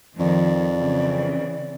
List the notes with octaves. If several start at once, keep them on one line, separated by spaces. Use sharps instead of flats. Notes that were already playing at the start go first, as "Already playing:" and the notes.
F2 D#3 F3 D5
C#3 E3 C4